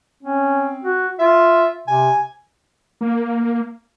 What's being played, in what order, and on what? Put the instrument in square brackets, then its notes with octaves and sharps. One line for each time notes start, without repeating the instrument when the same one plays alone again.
[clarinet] C4 [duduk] C#4
[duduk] F#4
[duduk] F4 [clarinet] E5
[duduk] C3 [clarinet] G#5
[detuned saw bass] A#3